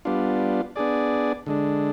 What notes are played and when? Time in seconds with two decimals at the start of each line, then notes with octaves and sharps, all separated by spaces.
0.05 G3 B3 D4 F4
0.76 B3 D4 G#4 D5
1.46 D3 G#3 D4